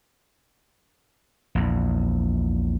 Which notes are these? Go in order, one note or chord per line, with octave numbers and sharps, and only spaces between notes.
A#1 E2